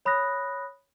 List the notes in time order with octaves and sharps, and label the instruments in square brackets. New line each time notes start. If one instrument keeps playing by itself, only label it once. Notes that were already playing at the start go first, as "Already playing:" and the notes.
[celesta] C#5 B5 D#6 F#6 A#6